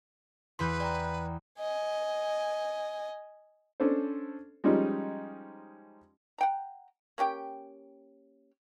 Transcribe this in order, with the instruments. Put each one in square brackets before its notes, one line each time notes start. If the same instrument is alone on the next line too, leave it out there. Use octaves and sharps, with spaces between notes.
[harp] E2 E3 G6 [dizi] B4 [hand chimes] C6 B6
[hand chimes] D5 G5 A#5
[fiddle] D#5 G#5
[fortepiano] C#4 D4 A4 C5
F3 G3 G#3 C#4 D#4 G4
[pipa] F#5 G5 A#5
A#3 C#4 G4 G5